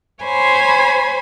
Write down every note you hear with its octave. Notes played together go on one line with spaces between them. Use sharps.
C5 C#5 G#5 B5